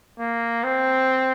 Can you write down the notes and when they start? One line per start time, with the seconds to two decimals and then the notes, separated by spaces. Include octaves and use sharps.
0.19 A#3
0.64 C4